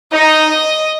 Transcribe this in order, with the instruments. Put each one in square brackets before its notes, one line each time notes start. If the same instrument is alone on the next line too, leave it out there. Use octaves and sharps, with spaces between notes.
[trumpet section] D#4 [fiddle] D#5